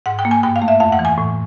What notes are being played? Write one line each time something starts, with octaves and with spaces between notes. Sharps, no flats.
G#2 F#5
G5
A#3
G#5
G2 G5
F5
A3
E5
F2 F5
F#5
E3
G#5
A2